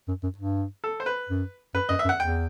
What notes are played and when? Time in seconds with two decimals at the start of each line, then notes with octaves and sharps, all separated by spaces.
0.08 F#2
0.23 F#2
0.38 G2
0.84 A4
1.00 C5
1.06 B4
1.29 F#2
1.74 F#2 B4
1.89 F#2 D#5
1.99 E5
2.05 F#2
2.09 F#5
2.20 E2 G5